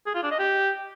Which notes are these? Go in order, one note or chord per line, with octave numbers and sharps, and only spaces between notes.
G#4
F4
D4
D#5
G4